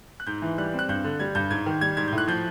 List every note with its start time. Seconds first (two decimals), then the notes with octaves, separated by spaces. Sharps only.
0.20 F#6
0.27 G#2 G6
0.42 E3
0.58 G3 F#6
0.73 C4
0.79 F#6
0.89 G2 G6
1.04 D3
1.19 G3 G#6
1.35 G2 G6
1.51 G#2 G#6
1.66 D#3
1.81 G3 G#6
1.97 G#2 G#6
2.08 A2 G6
2.18 F#6
2.28 F3 G6